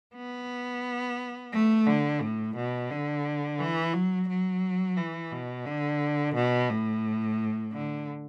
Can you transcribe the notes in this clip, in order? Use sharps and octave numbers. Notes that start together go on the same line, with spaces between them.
B3
A3
D3
A2
B2
D3
E3
F#3
F#3
E3
B2
D3
B2
A2
D3